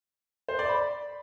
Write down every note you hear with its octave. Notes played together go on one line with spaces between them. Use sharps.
C5
D5
B5